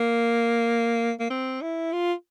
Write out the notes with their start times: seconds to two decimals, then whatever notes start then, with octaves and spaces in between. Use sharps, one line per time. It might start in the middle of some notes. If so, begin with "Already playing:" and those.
Already playing: A#3
1.20 A#3
1.30 C4
1.62 E4
1.92 F4